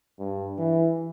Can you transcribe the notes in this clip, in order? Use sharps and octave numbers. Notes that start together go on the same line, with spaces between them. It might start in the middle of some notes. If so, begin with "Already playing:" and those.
G2
E3